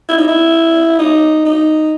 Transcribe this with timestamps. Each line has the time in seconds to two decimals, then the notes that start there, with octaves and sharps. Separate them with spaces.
0.09 E4
0.17 D#4
0.28 E4
0.98 D#4
1.45 D#4